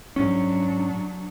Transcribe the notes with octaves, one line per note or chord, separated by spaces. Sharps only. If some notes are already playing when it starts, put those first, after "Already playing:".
G#2 F#3 C#4 D4